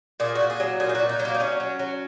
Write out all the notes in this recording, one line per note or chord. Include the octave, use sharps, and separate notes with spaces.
A#2 G#4
F#4
A#2
G#4
F#3
A#2 G#4
D#4
A#2 F#4
D#4
F#3
A#3
D#4
F#3 C#4
F#3
F#3